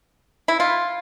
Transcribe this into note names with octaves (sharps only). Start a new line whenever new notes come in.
E4
F4